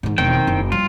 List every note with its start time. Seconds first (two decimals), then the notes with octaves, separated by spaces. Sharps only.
0.03 G#2 D#3
0.18 E1 D#3 C4 G5
0.47 F#1
0.72 G3 F4